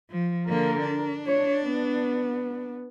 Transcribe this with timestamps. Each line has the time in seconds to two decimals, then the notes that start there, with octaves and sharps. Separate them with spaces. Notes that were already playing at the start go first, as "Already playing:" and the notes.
0.10 F3
0.48 D3 A#3 A#4
0.84 D4
1.27 C#5
1.65 B3